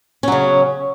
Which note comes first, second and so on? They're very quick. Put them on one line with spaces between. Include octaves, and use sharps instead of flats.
C#4 F#3 C#3